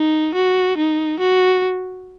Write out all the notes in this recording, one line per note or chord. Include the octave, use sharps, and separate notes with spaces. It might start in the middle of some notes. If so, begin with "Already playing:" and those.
Already playing: D#4
F#4
D#4
F#4